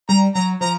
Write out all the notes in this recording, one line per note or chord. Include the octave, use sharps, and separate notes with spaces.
G3 A#5
F#3 A#5
F3 A#5